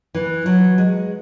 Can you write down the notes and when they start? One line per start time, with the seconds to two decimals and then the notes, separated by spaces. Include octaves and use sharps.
0.15 E3
0.46 F#3
0.78 G#3